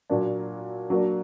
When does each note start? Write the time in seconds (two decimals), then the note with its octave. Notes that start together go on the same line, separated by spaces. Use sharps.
0.10 A#2 F#3 A#3 D4
0.90 F#3 A#3 D4